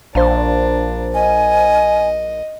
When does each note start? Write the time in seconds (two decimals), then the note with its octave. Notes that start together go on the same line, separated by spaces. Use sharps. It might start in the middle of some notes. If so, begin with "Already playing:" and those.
0.15 A#1 D4 C5 F5 A#5
1.14 D#5 G#5